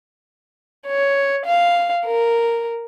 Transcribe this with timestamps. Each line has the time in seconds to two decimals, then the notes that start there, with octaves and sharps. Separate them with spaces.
0.86 C#5
1.46 F5
2.06 A#4